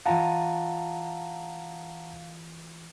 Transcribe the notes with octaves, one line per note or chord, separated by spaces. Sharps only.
E3 F4 D#5 F5 F#5 A5 A#5